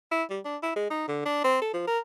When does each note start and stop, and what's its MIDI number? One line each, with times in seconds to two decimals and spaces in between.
0.11 0.23 64
0.30 0.40 55
0.45 0.56 62
0.62 0.71 64
0.76 0.89 56
0.90 1.06 63
1.08 1.22 50
1.25 1.41 62
1.44 1.61 60
1.61 1.72 69
1.73 1.84 53
1.87 1.98 70